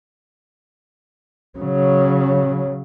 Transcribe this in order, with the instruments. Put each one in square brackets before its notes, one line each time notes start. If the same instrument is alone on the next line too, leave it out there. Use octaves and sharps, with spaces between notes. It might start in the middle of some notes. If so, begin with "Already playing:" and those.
[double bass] C#3 F#3